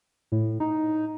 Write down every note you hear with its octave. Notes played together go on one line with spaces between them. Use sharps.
A2
D#4